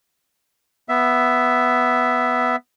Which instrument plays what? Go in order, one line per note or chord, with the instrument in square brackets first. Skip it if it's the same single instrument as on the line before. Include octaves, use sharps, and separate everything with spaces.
[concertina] B3 E5